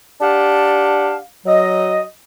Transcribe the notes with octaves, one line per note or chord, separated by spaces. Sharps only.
D4 G4 F5 F#5 A5
F#3 D#5